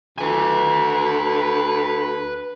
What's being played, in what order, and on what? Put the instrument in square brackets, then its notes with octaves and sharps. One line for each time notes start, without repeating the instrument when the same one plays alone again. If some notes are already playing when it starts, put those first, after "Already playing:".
[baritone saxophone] D2 [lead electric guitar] B4 G#5